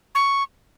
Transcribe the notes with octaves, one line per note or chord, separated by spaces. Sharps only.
C#6